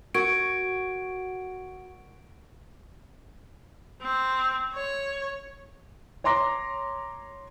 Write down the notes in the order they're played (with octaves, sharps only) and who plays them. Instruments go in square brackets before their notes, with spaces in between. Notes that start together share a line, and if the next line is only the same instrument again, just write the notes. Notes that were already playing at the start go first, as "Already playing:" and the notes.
[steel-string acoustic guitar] F#4 [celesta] A#4 C#6 G#6 [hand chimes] D7
[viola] C4
C#5
[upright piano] C#5 A#5 C6 D6 A#6